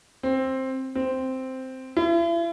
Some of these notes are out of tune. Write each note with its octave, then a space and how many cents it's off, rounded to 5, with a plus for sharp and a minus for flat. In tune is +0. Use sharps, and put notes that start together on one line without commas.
C4 +10
C4 -5
E4 +40